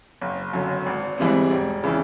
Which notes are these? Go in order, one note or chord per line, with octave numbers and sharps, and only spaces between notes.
F#1
F#2 D3
G#1
G#2 E3 G3 C4
E1
C#3 E3